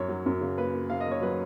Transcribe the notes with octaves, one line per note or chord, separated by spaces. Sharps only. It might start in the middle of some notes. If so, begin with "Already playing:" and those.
Already playing: F#2 C#5
F#3
F#2
C#3
A#3 B4
A#3
C#3 F5
D#5
A#3
C#5
F#3 B4